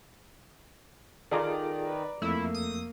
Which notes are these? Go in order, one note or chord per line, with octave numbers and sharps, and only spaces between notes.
D#3 F4 G#4 A4 D5 A#5 D6
B4
F2 A3 A#3 E4 E6
D#6